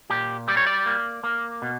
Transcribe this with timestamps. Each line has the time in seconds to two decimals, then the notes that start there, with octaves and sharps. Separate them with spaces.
0.10 A#2 G4
0.48 G3 D5
0.57 C#5
0.67 D5
0.86 A#3
1.24 A#3
1.62 B2